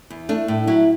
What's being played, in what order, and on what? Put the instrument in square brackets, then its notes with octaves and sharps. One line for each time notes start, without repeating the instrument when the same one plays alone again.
[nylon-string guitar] E2
A3 D4
A2
F#3 E4